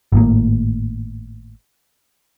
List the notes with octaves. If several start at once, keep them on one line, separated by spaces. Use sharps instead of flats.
G#1 A2 A#3